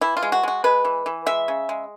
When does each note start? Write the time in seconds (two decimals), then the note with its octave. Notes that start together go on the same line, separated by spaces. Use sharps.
0.01 E3 E4
0.17 F4
0.23 G#3
0.32 F#4
0.43 G#3 F#4
0.64 G#3 B4
0.85 E3
1.06 E3
1.26 G#3 E5
1.48 C#3
1.69 G#3